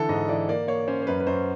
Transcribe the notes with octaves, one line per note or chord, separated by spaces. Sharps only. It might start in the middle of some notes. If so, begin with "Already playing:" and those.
Already playing: D3 E3 A4
G#2 D#5
E3 D5
A#3 D5
A#3 C#5
C#4 C5
C5
F#2 B4
B4
F#2 C5